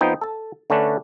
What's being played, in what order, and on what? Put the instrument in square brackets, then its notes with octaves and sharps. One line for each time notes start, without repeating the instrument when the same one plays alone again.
[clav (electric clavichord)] F2 F3 B3 D#4 G5
A4 A5
D3 A3 C#4 D4 B4